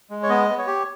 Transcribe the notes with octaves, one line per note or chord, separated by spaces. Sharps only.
G#3
C#5
B3 D#5
B3
C#5
G4